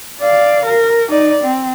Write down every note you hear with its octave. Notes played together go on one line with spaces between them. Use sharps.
D5 F5
A#4
D#4 D5
C4